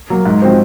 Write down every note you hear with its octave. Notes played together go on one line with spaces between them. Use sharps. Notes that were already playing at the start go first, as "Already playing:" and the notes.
F#3 A#3
G#2
F3 C4 F#4 C5